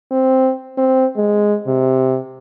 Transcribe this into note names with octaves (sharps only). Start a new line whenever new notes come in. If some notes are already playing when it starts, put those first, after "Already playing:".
C4
C4
G#3
C3